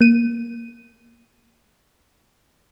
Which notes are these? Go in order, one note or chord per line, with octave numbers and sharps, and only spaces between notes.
A#3 D#7